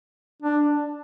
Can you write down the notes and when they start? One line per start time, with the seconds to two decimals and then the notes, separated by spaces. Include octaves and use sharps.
0.42 D4